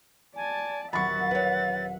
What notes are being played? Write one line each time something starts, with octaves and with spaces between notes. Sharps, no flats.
D5 G#5 A5
D#1 F#3 C4 E5 F#5 B5 C#6 A6
B4 C#5